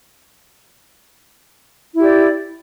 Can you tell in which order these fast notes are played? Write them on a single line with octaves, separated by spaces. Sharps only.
E4 G4 D5